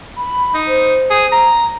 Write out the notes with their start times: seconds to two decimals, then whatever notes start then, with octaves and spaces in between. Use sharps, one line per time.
0.17 B5
0.54 D#4
0.67 C5
1.10 G#4
1.32 A#5